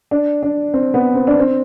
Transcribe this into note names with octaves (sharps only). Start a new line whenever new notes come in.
D4
D4
C4
B3
C4
D4
C4